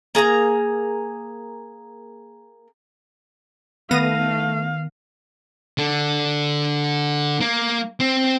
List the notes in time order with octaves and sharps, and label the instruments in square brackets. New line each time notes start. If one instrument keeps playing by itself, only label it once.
[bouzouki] A#3 G#4 A5 A#5
[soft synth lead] D#3 [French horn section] A3 [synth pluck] B3 A#6 D#7 [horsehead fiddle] F5
[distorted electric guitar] D3
A#3
C4